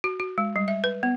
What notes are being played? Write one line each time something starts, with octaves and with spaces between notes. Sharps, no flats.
F#4
F#4
G#3
G3
E5
B4
B3